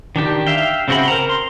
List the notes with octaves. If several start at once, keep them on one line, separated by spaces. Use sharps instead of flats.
D#3 D4 G4
E5 F5 G5
C#3 C4 F#4 G5 B5
A#4 C5 A#5
C6